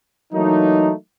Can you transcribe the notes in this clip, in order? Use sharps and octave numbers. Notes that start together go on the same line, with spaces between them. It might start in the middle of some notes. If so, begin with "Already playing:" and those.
E3 F#3 A3 A#3 D#4